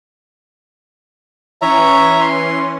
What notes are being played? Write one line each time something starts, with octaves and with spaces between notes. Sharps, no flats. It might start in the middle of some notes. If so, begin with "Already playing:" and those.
E3 C#4 C#5 E5 A#5
C6